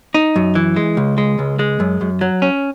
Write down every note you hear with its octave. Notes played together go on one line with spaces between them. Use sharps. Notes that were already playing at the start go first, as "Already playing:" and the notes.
D#4
F#2
E3
G#3
C#2
G#3
C#2
G#3
F#2
F#2
F#3
C#4